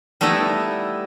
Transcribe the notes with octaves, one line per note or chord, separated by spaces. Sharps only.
G3 A3 B3 D#4 E4